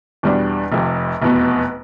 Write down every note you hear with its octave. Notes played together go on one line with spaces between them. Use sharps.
E2 B2 G3 D4
F1 F2 C3
F1 E2 B2 B3